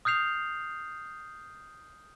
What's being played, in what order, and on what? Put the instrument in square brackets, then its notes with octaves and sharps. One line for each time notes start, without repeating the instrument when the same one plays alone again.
[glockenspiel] D#6 F6 G6 C7 F7